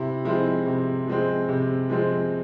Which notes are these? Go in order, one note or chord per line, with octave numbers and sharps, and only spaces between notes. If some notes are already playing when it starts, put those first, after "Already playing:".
Already playing: C3 E4
F3 G#3 C4 E4
C3
F3 G#3 C4
C3
F3 G#3 C4